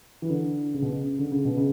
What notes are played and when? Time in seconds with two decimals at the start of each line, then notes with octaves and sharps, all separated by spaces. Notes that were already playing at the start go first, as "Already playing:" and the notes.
0.22 E3
0.30 D3
0.74 C#3
0.82 B2
0.90 C#3
1.19 D3
1.32 C#3
1.45 B2
1.57 C#3